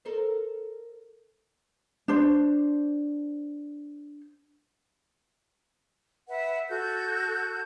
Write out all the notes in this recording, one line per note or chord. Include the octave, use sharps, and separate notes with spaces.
A4 A#4 C5
D4 C5
B4 E5 F#5
F#4 A4 G6